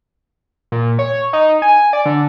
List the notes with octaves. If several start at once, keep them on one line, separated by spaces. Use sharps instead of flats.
A#2
C#5
D#4
G#5
D5
D3